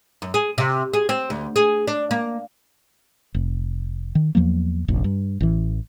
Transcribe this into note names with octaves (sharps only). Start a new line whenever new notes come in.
F#2
G#4
C3
G#4
C4
D2
G#4
D4
A#3
F1
D#3
E2 F3 F#3 A#3
F1 A#1
G2
A1 E3